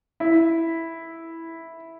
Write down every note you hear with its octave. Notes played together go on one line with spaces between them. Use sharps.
E4